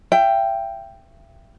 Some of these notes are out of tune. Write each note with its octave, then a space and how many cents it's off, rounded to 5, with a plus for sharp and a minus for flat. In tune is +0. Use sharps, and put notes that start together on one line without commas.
E5 +35 G5 +0